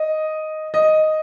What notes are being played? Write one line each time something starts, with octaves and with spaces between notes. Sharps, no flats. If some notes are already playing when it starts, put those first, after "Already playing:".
Already playing: D#5
D#5